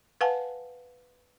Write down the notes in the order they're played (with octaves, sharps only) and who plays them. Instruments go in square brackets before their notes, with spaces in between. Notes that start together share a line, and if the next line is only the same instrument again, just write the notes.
[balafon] B4 F5 F#5 G#5 A5